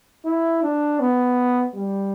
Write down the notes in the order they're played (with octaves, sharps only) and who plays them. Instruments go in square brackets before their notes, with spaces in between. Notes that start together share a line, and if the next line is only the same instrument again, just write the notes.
[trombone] E4
D4
B3
G3